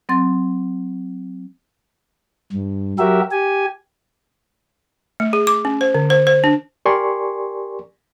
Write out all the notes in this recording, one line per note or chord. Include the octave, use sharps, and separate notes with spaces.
F#3 C4 C6 A6
G2
F#3 F#4 G4 A#4 E5
G4 G#5
A3
G#4
D6
C#4
C5
D3
C5
C5
D4
G4 A#4 D5 G#5 C6 C#6